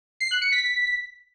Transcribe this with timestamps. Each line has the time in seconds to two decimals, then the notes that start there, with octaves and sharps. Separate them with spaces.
0.20 C7
0.31 F#6
0.41 C#7
0.52 B6